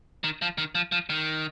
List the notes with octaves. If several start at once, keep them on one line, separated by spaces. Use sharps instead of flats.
D#3
F3
D#3
F3
F3
D#3